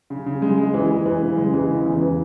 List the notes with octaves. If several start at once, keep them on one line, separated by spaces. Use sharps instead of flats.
C#3
C#3
G#3
G#3
E3
E3
E3
C#3
G#3
E3
C#3
E2
E3